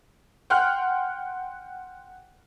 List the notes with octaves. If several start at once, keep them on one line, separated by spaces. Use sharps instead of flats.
F#5 G5 C6 F6 F#6